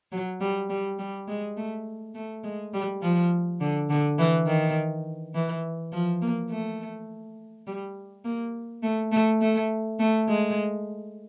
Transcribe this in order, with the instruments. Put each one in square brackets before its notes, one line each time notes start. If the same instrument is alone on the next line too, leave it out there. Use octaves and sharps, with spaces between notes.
[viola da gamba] F#3
G3
G3
G3
G#3
A3
A3
G#3
G3
F3
D3
D3
E3
D#3
E3
F3
A#3
A3
G3
A#3
A3
A3
A3
A3
G#3